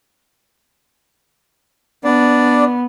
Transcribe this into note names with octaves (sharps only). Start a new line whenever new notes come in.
B3 D4 D5